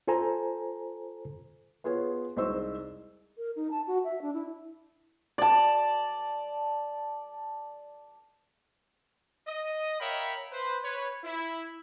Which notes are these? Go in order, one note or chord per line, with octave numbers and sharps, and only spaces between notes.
F4 A4 C5 G#5 A#5
B3 F4 G#4 B4 C#5
C2 G#3 D#4 C5 C#6 E6
A#4
D#4
A5
F#4
E5
D4
E4
D5 A5
D#5
A#4 C#5 E5 F5 G5 B5
B4 C5
B4 C#5
E4